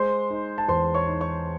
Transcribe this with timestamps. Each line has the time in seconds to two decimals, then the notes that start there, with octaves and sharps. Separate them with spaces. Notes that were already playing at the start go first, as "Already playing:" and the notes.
Already playing: G#3 C5 C6
0.30 D#4
0.58 A5
0.68 E2 C5 C6
0.94 C#5 C#6
1.07 D#4
1.20 C#5 C#6